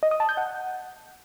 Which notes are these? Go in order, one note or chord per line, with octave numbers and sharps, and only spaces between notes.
D#5
D#6
A5
G6
F#5